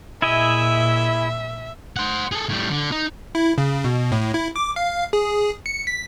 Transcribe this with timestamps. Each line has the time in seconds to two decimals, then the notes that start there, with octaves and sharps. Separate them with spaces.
0.22 A#2 E4 G#4 D#5 E5
1.97 C5 F#5
2.32 G#4 A4
2.49 A2 G3
2.71 D3
2.92 D#4
3.35 E4
3.58 C#3
3.84 B2
4.12 A2
4.34 E4
4.56 D6
4.76 F5
5.13 G#4
5.66 C#7
5.87 B6